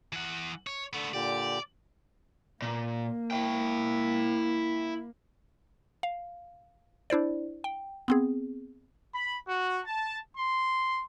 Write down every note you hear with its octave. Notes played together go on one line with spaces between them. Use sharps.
E3 F#5
C#5
D3 A3 B3
A#2 D3 G4 D5
A#2 A#3
E4 G5
F5
D4 E4 C5 D5
G5
B3 C4 G#4
B5
F#4
A5
C6